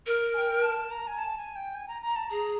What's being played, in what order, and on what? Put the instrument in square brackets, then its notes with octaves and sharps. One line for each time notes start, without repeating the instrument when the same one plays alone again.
[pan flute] A#4
[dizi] G#5
G5
A5
A#5
G#5
A5
G#5
G5
G#5
A#5
A#5
A5
[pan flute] G#4 [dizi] A#5